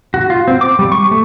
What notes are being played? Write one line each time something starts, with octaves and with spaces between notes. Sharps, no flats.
F#4
F4
C4
D6
G3
C#6
A3